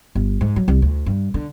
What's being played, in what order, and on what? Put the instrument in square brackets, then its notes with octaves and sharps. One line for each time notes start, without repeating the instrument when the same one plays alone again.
[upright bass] G1
G#2
F#3
C2
D2
G2
D3